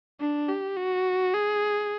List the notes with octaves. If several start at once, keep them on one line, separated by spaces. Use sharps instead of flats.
D4
G4
F#4
G#4